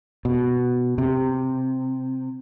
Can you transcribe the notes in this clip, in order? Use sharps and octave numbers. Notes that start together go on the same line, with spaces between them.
B2
C3